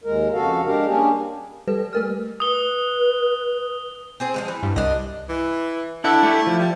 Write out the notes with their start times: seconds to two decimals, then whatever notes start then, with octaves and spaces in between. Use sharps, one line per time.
0.04 D#2 G#3 A#4
0.33 F2 C#3 F#4 A4 F5
0.65 G#3 D4 G4 A#4 F5
0.86 G3 A#3 C#4 D4 G4 G#4
1.68 G3 A4 B4
1.93 A3 A#4 F6
2.40 B4 D#6 G7
4.20 C4 G#4 C5
4.34 F3 F#3 G#3
4.48 E3
4.63 G2
4.76 C2 D4 D#5
5.29 E3
6.04 D4 E4 A4 F#5
6.23 A3 G4
6.47 F3
6.59 G3